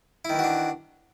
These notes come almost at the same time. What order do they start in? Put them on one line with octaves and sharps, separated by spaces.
E4 D#3 E3 F#4 D4